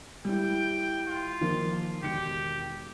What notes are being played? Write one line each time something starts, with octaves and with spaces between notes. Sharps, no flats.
G3 E4 G5
F4
D#3 F3 A#3
E1 D#3 G4 C#7